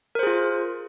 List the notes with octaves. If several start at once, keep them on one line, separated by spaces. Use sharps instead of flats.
F4 G#4 A#4 C5